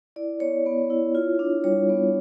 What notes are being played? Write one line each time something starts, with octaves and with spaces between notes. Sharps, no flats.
E4 D5
B3 C#5
B3
E4
F4
D4
G3 C#5
B3